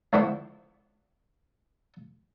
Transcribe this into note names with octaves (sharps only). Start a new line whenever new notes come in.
C#2 D3 F3 B3 E4 C6